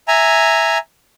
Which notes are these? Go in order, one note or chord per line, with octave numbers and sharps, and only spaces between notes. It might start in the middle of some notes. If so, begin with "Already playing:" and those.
E5 G#5 A#5